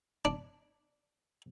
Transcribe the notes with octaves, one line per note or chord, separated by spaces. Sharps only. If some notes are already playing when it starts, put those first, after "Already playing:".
D4